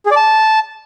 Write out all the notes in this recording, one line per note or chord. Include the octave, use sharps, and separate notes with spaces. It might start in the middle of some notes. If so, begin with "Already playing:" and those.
G#4
D5
A5